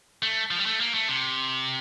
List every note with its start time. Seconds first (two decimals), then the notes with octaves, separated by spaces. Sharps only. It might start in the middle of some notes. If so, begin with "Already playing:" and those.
0.23 A3
0.51 F3
0.58 G3
0.66 A3
0.81 A#3
0.94 A3
1.09 C3